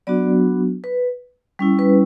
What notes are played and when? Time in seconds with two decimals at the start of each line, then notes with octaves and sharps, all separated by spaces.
0.07 F#3 B3 D4 F#4 D5
0.84 B4
1.59 G3 C#4 E4
1.79 B4